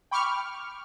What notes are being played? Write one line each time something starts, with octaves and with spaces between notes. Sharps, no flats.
G5 B5 C#6 D6 F6